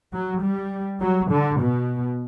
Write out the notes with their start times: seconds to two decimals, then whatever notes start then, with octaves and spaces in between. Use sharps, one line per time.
0.12 F#3
0.42 G3
1.01 F#3
1.31 D3
1.61 B2